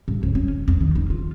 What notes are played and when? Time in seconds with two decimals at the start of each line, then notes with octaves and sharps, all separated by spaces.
0.08 G2
0.23 C#2
0.35 C#4
0.48 D#3
0.68 E2
0.81 D#3
0.95 D#4
1.10 F4